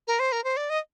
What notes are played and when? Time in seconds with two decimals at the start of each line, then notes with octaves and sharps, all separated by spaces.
0.07 A#4
0.19 C5
0.32 A#4
0.44 C5
0.57 D5
0.70 D#5